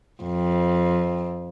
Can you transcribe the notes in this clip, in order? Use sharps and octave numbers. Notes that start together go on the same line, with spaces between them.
F2